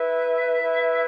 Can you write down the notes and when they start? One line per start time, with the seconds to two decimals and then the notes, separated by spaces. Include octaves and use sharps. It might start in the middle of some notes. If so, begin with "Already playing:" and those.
Already playing: E4 B4 E5
0.59 E4 B4